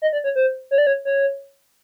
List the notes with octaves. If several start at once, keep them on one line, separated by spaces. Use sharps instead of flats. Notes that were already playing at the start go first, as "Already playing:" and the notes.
D#5
D5
C#5
C5
C#5
D5
C#5
C#5